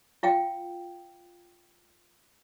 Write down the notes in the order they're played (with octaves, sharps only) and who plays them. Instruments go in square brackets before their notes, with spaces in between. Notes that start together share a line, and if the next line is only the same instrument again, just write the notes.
[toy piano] F4 F5 G5